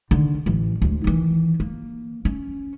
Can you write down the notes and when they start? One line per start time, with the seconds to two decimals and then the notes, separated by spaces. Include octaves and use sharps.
0.11 D3 D#3
0.46 A1 E3
0.82 D2 G#3
1.04 D#3 E3
1.60 A#3
2.25 C#4